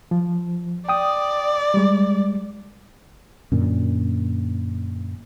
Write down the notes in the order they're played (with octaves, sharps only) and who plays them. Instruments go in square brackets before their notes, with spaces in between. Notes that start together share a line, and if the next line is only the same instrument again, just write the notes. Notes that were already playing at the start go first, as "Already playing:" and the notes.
[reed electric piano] F3
[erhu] D5 [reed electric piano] G5 D#6
[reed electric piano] G3 G#3
[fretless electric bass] F#2 A#2 D3